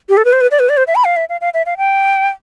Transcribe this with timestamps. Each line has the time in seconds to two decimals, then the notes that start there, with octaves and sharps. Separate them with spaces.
0.09 G4
0.17 A4
0.25 B4
0.33 C5
0.41 B4
0.51 D5
0.59 B4
0.69 D5
0.77 C5
0.87 E5
0.95 B5
1.05 F5
1.16 E5
1.29 F5
1.41 F5
1.54 E5
1.66 F5
1.78 G5